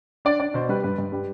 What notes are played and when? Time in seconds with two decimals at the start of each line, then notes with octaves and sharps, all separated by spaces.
0.25 D4 D5
0.40 D4 D5
0.54 B2 C5
0.69 G3 B4
0.83 G2 B4
0.98 G2
1.12 G3